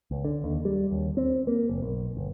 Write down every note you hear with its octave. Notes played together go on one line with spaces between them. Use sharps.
C#2
D3
D#2
G3
D#2
C4
A#3
F#1
B1
G1